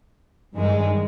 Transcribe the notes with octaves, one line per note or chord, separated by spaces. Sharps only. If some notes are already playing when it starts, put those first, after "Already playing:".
G2 D#3 G#3